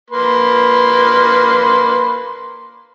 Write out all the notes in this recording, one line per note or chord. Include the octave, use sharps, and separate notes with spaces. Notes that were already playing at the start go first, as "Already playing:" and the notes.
A#3 B4 C6